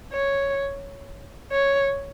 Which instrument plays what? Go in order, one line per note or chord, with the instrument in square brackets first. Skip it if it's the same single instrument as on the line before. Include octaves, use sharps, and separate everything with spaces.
[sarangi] C#5
C#5